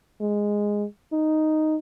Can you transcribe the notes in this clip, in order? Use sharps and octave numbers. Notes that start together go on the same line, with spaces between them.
G#3
D#4